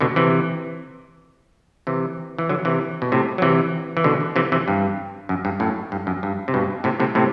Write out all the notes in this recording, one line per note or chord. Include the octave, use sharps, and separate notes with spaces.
B2 D3
C3 E3
C3 E3
E3
D3 F#3
C3 E3
B2
A2 C3
F#3
C3 E3
E3
B2 D3
C3 E3
C3 E3
G2
F#2
G2
F#2 A2
G2
F#2
G2
C3
G2 B2
A2 C3
A2 C3
A2 C3